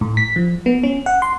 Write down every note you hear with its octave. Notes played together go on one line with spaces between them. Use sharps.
A2
B6
F3
B3
C#4
F#5
C6